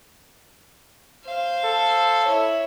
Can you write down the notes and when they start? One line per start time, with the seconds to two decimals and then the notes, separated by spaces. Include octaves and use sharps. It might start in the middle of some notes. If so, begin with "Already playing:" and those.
1.25 C5 F5
1.64 A4
2.25 E4 C#5